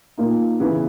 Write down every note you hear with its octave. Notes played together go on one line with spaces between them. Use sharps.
A#2 A#3 D#4
C#3 E3 B3